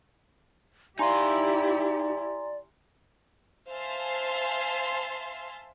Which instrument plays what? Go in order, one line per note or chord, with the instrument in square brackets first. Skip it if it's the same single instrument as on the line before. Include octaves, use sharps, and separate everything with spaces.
[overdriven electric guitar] D#4 F5 [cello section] E4 G4 [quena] D5 [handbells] G#5 A#5 C6
[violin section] C5 E5 F5 G#5 A5 C6